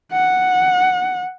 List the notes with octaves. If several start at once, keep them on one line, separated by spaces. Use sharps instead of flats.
F#5